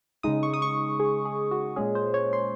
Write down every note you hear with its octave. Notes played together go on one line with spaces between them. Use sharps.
C#3 G#3 D#4 D#6
C#6
D#6
C#6
G#4
G#4
F#4
A#2 G#3 C#4 G#4
C5
C#5
C6